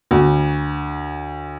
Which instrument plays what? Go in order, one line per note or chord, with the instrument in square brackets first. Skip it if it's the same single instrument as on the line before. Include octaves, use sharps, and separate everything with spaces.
[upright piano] D2